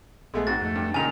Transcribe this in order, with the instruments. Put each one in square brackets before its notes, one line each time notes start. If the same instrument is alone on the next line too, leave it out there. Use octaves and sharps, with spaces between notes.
[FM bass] A#1 [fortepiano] G#3 A3 G#4 [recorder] B3
[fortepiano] G#2 F#4 [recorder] C4 [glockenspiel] A6
[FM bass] F2 [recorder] A3
[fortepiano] G2
[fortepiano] C#2 A#2 D#3 [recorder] D#4 [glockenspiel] G#5 F7